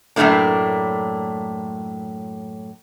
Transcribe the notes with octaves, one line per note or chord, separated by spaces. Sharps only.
F#2 A2 C#3 A3 A#3 D4